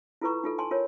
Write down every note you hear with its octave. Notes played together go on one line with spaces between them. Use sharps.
E4 F4 A4 B4 A#5 C#6
D#4 F4 A4
G#5 A5 C6
F4 A#4 C#5